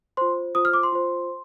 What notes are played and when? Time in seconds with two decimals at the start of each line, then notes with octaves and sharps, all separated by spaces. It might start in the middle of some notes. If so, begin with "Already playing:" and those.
0.17 F4 C5 C6
0.55 F4 C5 D#6
0.65 F6
0.73 D6
0.83 C6
0.92 F4 C5